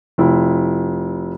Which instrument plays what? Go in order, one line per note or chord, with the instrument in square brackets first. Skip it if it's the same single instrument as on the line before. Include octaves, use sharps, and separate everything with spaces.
[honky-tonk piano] F1 E4